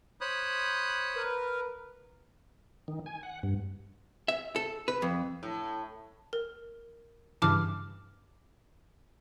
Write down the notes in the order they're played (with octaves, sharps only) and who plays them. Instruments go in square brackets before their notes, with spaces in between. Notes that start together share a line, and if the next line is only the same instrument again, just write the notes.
[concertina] C5 C#5 [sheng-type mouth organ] B5 D#6 F#6
[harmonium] A#4 B4
[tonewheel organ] D#3
G#5
F#5
G2
[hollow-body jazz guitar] E5
A4
B4
F2
[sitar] A2
[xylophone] A#4
[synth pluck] G2 C#3 E3 [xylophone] A5 D6 F6